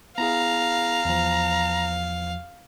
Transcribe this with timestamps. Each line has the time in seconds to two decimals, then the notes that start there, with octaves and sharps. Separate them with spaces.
0.18 B3 E4 G#4 F5 A#5
1.05 E2 F3